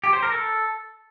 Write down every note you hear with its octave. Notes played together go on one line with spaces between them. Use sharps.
G4
C5
A#4
A4